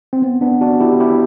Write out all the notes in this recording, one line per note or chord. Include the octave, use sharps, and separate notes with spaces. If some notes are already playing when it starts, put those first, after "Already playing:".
C4
B3
B3 D4
D4 F#4
E4 G4
E4 G4